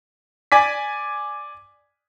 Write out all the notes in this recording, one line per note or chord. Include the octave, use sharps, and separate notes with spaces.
D5 G#5 D6 B6